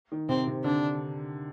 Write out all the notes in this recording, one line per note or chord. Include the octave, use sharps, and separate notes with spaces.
D#3
C3 C4
C3
D3 D4